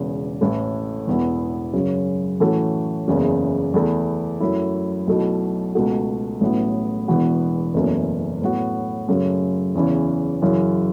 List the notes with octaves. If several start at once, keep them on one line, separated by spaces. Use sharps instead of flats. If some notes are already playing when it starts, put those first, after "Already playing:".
Already playing: E1 E2 C#3
A1 A2 A3
E1 E2 E3 B3 E4
F#2 C#3 F#3 C#4
A2 E3 A3 C#4 F#4
F#1 E2 C#3
E2 E3 A3 E4
F#2 F#3 A3 E4
B1 B2 A3 E4
C#2 B2 A3 F#4
A1 A2 F#3 B3
E1 E2 E3 B3 F#4
F#1 E2 B2 A3 C#4
A2 F#3 B3 F#4
F#2 C#3 A3
E2 C#3 E3 C#4
F#2 C#3 E3 C#4 E4